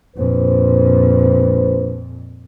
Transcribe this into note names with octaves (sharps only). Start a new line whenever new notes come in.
A#1 F2 A#2 B4 C5